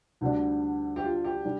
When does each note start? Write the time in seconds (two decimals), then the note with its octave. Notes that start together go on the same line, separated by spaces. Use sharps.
0.21 D2 D3 G3 D4
0.96 G4
1.03 F4
1.24 G4
1.45 G3 D4